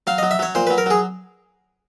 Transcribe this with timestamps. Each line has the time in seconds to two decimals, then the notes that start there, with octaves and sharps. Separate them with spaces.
0.07 F#3 F5
0.18 F#3 D#5
0.31 E5
0.39 F#3 C#5
0.55 A#2 C5
0.67 F#3 B4
0.78 A#4
0.86 F#3 G#4